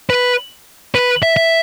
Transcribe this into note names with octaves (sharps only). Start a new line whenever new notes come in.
B4
B4
E5
E5